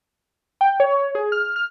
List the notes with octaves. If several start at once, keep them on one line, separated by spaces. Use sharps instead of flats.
G5
C#5
G#4
F6
F6